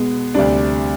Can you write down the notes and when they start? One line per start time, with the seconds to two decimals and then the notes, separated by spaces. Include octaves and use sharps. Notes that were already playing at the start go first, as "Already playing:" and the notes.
Already playing: B2 G#3 B3
0.34 D2 C3 G3 D4 D5